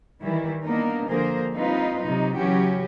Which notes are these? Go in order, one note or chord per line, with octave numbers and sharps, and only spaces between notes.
D#3 E3 G3 E4
A#3 B3 D4 D#4 A#4
D3 F3 A#3 G#4 A#4 C5
G3 C4 D#4 F4 B4
C3 F#3 D#4
C#3 E3 F#3 C#4 F#4 G4